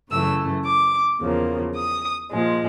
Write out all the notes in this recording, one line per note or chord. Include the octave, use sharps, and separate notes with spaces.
F#2 C#3 E3 A3 E6
D6
E2 C#3 F3 A#3
D#6
A#2 F3 G#3